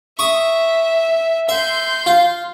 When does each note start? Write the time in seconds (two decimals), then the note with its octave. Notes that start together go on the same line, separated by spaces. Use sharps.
0.19 E5 C#6 D#6
1.49 E5 C6 G6
2.06 F4